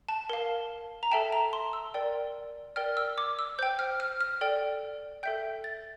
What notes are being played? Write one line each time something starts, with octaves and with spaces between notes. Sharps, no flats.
A5
A#4 F5
A#5
A4 E5 G5 A5
A#5
C6
E6
A#4 D5 G5
A#4 D5 G5 F6
E6
D6
E6
C5 G5 G6
F6
F6
F6
A4 D5 G5
A4 E5 G5 G6
A6